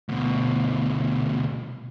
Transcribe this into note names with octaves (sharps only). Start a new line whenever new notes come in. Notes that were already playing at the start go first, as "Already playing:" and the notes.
D2 B2